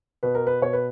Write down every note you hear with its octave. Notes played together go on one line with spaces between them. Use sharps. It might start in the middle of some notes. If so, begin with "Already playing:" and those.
B2 B4
A#4
B4
B2 C#5
B4